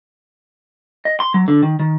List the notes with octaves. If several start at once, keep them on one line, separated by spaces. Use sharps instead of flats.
D#5
C6
F#3
D3
D#3
D#3